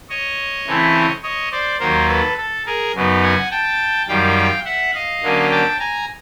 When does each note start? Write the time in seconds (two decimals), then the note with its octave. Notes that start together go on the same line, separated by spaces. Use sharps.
0.10 C#5 D#5
0.66 C#3 E3 A3 C4 E4
1.23 C#5 D#5
1.52 C5 D5
1.80 D#2 D#3 F#3 A#3 A#4 C5
2.08 A4 B4
2.37 A4
2.66 G#4 A#4
2.95 F#2 C#3 F#3 B3 D#4
3.23 F#5 G#5
3.51 G5 A5
4.08 F#2 D#3 G3 F5 G5
4.65 E5 F#5
4.94 D#5 F5
5.23 D3 F#3 A#3 C#4
5.51 G5 A5
5.79 G#5 A#5